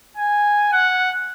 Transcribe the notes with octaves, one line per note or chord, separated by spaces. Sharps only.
G#5
F#5